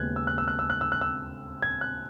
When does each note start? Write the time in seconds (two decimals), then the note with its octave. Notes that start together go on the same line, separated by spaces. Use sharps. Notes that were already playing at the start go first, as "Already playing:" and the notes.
Already playing: D#2 C#3 G#3 B3 F#6 G#6
0.16 E6
0.27 F#6
0.38 E6
0.48 F#6
0.59 E6
0.70 F#6
0.81 E6
0.92 F#6
1.01 E6
1.62 G#6
1.81 F#6